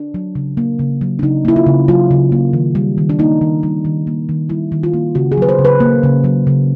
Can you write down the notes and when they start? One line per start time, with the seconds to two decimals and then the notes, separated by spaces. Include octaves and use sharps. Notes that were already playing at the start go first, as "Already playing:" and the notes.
Already playing: D4
0.14 F#3
0.35 C#3
0.57 A#3
0.79 C#3
1.01 F#3
1.19 D4
1.22 C#3 D#4
1.45 A#3 E4
1.56 F4
1.66 C#3
1.88 F#3 F4
2.11 C#3
2.32 A#3
2.53 D#3
2.75 G3
2.98 D#3
3.10 D4
3.19 A#3 D#4
3.41 D#3
3.63 G3
3.85 D#3
4.07 A#3
4.29 D#3
4.50 G3 E4
4.72 D#3
4.83 F4
4.94 A#3
5.15 C#3 F#4
5.32 G#4
5.38 F#3 B4
5.49 C5
5.59 C#3
5.65 B4
5.80 A#3
6.03 C#3
6.24 F#3
6.47 C#3